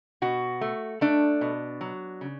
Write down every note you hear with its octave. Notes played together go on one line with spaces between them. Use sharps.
B2 F#4
A3
A3 D4
B2
F#3
C#3